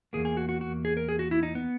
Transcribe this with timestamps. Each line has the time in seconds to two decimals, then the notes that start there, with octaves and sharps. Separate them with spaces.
0.13 E2 B2 A#3 G#4
0.25 G#4
0.37 F#4
0.49 F#4
0.61 F#4
0.85 G#4
0.97 A#4
1.09 G#4
1.19 F#4
1.31 E4
1.43 D#4
1.55 B3